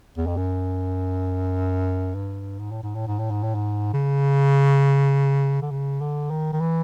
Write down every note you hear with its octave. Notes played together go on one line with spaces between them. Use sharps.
E2
F2
F#2
G2
G#2
A2
G#2
A2
G#2
A2
G#2
A2
G#2
C#3
D3
C#3
D3
D#3
D#3
E3